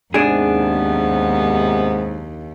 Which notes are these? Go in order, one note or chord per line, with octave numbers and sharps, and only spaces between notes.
D#2 G#2 C3 B3 D4 G#4